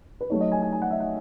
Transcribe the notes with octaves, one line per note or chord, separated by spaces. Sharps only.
B4
F#3 A3 D#4 C#5
D#5
G#5
G#5
G#5
F#5
E5
F#5